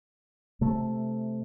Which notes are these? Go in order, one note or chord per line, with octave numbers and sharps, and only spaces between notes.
C3 A3